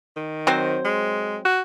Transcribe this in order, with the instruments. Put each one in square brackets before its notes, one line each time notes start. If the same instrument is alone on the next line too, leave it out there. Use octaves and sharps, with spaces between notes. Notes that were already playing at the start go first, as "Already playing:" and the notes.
[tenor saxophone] D#3
[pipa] F#3 C4 C5
[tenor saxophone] G#3
F#4